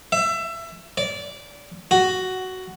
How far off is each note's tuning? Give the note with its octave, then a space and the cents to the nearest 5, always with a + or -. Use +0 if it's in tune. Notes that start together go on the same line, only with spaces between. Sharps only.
E5 +25
D5 -20
F#4 +10